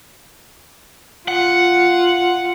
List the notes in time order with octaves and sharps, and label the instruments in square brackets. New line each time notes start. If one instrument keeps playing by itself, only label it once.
[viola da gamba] F4 [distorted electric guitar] F#5